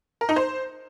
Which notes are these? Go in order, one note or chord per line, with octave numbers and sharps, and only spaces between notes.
A#4
D#4
C5